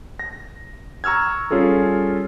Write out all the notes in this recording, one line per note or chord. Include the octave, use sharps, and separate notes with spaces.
A#6
A#5 C#6 E6 F6 G#6
G3 C#4 F4 G#4 A4